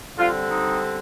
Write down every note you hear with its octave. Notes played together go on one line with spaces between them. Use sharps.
D3 G3 C4 F4
D#4